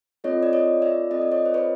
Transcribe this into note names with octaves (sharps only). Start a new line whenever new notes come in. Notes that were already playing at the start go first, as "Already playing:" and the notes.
C4 F4 A4 C#5 D#5
D5
C#5 D#5
D5 E5
C4 F4 A4 D#5
D5
C#5 D#5
C5
B4 C#5